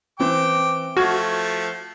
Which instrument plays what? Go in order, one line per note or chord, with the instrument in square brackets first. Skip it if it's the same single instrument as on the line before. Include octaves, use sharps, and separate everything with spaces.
[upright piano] E3 C4 [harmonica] G5 D6
[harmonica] F3 A3 [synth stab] F#4 [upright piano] F6 G#6